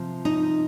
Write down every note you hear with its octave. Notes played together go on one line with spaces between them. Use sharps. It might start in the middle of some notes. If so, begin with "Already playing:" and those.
Already playing: C3 F3
D#4